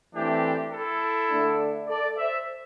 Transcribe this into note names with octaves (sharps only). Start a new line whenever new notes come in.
E3 A3 C4 D4 G4
E4 A4
D3 A3 D4
A4 D5
C5 E5